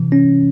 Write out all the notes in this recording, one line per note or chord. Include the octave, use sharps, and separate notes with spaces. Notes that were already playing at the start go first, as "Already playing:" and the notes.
Already playing: C3 E3
C#4